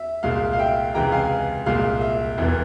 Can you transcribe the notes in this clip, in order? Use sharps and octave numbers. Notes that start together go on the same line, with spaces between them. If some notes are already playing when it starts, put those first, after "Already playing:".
Already playing: E5
C2 A#2 G#3 F5
F5
E5 G5
C#2 C3 E3 G#3 G5 A#5
F5 G#5
C2 A#2 G#3 F5
E5
F1 E2 E3